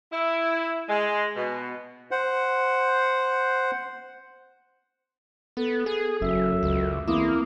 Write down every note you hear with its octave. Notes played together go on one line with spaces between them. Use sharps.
E4
G#3
B2
C5 F#5
B3 A4
G#4
F#1 F#2 E5
C#2
E2 A#3 C4 E4 D6 D#6